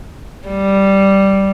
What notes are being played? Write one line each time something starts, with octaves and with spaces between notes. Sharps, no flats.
G3